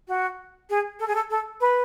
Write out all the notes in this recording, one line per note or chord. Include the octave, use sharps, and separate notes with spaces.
F#4
G#4
A4
G#4
A4
A4
B4